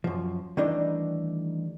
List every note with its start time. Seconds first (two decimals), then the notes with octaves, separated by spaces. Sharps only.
0.04 F#2 F3
0.57 D#3 E3 G3 A3 D4 D#4